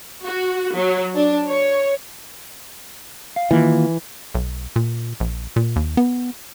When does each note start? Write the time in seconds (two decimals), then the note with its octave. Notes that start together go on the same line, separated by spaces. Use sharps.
0.23 F#4
0.75 F#3
1.16 D4
1.47 C#5
3.36 F5
3.51 D#3 E3 A#3 F4
4.35 B1
4.76 A#2
5.20 A#1
5.56 A#2
5.76 D#2
5.97 B3